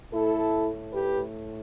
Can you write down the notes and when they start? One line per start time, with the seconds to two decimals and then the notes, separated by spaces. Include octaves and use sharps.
0.11 A2 A3 E4 A4
0.93 G4 B4